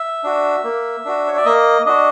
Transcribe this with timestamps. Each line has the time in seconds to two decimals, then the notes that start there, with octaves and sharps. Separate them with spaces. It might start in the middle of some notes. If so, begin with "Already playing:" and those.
Already playing: E5
0.24 D4 F#4
0.64 A#3
1.05 D4 F#4
1.28 C#5
1.37 D5
1.45 A#3 D#5
1.86 D4 F#4 D#5